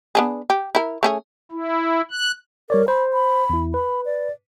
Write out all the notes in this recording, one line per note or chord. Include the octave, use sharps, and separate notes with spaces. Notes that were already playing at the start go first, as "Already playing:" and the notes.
B3 D4 G#4
G4
E4 A#4
A3 C#4 G#4
E4
F#6
G3 A#4 C#5 D5
C5 B5
B5
E2 E4
B4 B5
D5